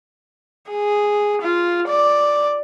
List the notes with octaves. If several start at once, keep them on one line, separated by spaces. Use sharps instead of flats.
G#4
F4
D5